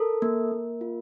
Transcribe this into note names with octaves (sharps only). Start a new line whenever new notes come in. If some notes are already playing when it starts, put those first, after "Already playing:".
Already playing: A4 A#4
A#3
A#3
F4